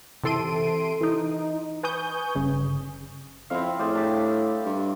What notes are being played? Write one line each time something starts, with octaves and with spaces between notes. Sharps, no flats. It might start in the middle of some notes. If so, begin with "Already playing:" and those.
C3 E3 A4 C6 D7 D#7
E3 D#4
B4 G#5 C#6 D#6 G6
G1 C#3
F2 C4 E4 F5
A2 G#4 C5 D5
G3 D4 G4
G2